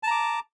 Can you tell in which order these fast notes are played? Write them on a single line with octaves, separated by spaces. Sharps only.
A5 A#5 D6